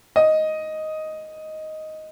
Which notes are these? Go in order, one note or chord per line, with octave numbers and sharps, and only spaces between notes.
D#5